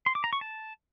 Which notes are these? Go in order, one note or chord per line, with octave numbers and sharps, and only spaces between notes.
C6
D6
A#5
C#6
A5